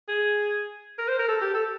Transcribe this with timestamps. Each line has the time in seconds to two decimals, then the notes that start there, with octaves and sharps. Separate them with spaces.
0.09 G#4
0.99 A#4
1.08 C5
1.19 A#4
1.28 A4
1.41 G4
1.55 A4